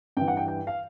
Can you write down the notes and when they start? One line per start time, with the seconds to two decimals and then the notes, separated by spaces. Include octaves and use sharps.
0.17 G2 E3 G5
0.28 F#5
0.37 G5
0.48 G5
0.67 F5